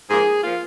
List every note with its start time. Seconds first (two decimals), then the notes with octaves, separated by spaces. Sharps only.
0.09 G#2 F3 A#3 G#4
0.43 F3 A#3 F4